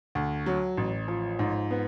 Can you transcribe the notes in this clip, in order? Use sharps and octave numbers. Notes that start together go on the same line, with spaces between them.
D2
F#3
A1
F3
G#2
B3